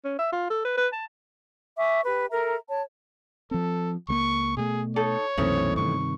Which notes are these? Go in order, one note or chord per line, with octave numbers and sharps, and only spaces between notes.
C#4
E5
F4
A4
B4
B4
A5
E5 G#5 C#6 D6
G4 B4
A4 A#4 E5 A#5
C#5 A5
F3 C4 A4
C#2 A3 A#3 C#6
B2 A3 G#4
D#4 A4 C#5
C2 F#2 B2 E3 A3 C4 C#4 D#4
G2 C3 D#3 C#6